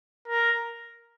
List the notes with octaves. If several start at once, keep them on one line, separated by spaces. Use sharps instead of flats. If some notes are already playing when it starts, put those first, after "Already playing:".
A#4